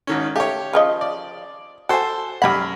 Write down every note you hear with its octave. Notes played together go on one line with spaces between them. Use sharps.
G#1 D#3 C#4
A3 G4 C#5 F5
C#3 F3 D#5
D5
F#4 A4 C5 G#5
F#2 G3 D#4 F#5 B5